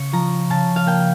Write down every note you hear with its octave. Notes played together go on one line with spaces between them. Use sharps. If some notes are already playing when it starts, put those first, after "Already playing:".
Already playing: C#3 C#6
F3 A#5
C#3 A5
F5
A#3 G5